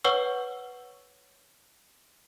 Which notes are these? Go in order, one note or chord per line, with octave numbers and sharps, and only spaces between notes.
B4 C#5 F#5 C#6 E6